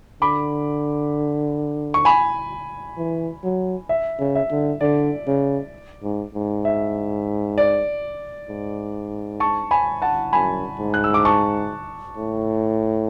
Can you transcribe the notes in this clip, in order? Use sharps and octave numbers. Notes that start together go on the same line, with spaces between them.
D3 B5 D6
C#6
G#5 B5
E3
F#3
E5
C#3
E5
D3
D3 D5
C#3
G#2
G#2
E5
D5
G#2
A5 C#6
G#5 B5
F#5 A5
F#2 G#5 B5
G#2
F#6
E6
D6
A5 C#6
A2